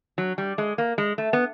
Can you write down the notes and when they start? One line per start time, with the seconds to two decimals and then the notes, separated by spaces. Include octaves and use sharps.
0.18 F#3
0.38 G3
0.58 G#3
0.78 A#3
0.98 G#3
1.18 A3
1.33 B3